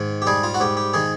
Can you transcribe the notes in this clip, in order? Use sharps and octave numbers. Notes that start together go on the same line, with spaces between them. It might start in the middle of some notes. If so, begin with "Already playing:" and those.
Already playing: G#2 D#3
G4
G3 G#4
F4
F#4
G#2 G4
G4
D#3 G#4